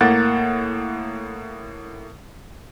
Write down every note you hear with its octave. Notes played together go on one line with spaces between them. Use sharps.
A2 A#3 F#5 A6